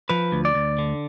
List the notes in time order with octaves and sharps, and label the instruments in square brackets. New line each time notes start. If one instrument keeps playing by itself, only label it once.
[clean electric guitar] F3 B4
D2
D5
D2
D3